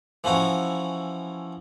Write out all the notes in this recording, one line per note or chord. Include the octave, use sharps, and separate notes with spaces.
E3 F3 C#4 F#4